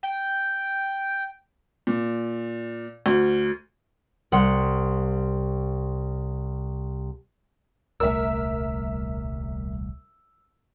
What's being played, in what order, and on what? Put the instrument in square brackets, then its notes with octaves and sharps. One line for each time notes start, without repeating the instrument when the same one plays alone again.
[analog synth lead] G5
[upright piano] A#2
D2
[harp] C2 F#5 C6
[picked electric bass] D#1 C2 A3 [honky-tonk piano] A#4 E5 [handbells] E6